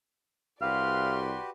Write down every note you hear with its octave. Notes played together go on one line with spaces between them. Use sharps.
C2 F#4 G4 B4 D5 F5 C6